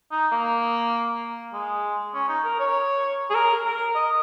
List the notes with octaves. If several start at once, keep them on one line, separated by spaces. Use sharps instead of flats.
D#4
A#3
G#3
C#4
D#4
A#4
C#5
G#4
A#4
A#4
D#5